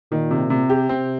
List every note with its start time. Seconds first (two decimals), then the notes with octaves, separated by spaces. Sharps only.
0.11 A#2 D#3
0.31 C3
0.50 C3
0.70 G4
0.89 C3 C4